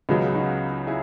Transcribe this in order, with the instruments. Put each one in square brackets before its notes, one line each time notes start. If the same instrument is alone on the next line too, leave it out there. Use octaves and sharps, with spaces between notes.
[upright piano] C#2 C#3 F#3 [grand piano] B3 D#4
[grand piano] D#4 F#4
E4 G#4